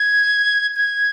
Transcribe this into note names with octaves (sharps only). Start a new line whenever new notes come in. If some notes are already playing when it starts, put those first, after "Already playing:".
Already playing: G#6
G#6